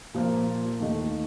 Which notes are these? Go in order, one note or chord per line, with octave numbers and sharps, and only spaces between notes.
A#2 F3 A#3
D#2 D#3 A3 D#4